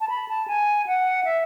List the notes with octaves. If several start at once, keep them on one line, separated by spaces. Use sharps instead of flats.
A5
B5
A5
G#5
F#5
E5